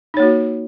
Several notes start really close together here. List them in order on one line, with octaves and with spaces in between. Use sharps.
D#4 C#5 A#3 F#4